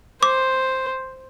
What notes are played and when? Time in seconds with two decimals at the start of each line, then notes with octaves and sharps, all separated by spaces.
0.23 C5 D6